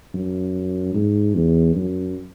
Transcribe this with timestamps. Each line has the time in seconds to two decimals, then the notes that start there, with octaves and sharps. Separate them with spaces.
0.14 F#2
0.95 G#2
1.35 E2
1.76 F#2